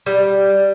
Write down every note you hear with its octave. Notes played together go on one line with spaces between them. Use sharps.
G3